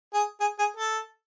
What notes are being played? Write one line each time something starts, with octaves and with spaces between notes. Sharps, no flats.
G#4
G#4
G#4
A4